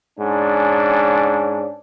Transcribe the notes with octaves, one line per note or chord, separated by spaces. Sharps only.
G#2 C#4 D4